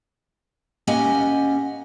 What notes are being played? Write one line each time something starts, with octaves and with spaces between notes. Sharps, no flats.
A#3 C#4 G4 D#5 F#5 G#5